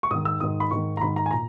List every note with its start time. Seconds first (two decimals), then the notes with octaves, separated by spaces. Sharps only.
0.03 C#6
0.11 G#2 D#3 D#6
0.25 E6
0.40 G#2 D#3 D#6
0.60 B5
0.71 G#2 D#3 C#6
0.97 A#5
1.01 G#2 D#3 B5
1.16 A#5
1.26 G#5
1.31 A#2 A#5